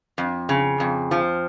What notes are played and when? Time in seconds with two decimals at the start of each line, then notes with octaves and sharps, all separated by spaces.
0.18 F2
0.49 C#3
0.80 F2
1.11 F3